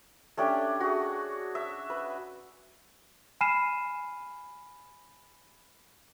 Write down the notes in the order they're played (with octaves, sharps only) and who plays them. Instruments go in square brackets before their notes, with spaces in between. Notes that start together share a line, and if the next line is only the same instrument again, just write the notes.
[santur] A3 C#4 D4 G4
F#4 G#4
E5
B4
[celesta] G#5 B5 F6 C7 D#7 E7